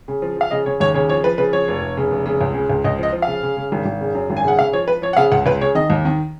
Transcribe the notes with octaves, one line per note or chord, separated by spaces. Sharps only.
C#3
F3
F3 F5
C#3 D#5
C#3 C#5
D#2 C#5
C#3 C#5
F3 C#5
F3 B4
C#3 B4
F3 C#5
F1
F1
C#3
F1
C#3
C#2
C#3
C#2
C#2 D#5
F3 D#5
F3
C#3 F5
C#3
C#3
G#1
G#1
C#3
F#2
G#1
G#5
C#3 F#5
C#3 F5
F3 C#5
F3 B4
F3 C#5
F#5
C#3 F5
C#2 F#5
C#2 B4
C#3 C#5
D#3 D#5
D#2
D#3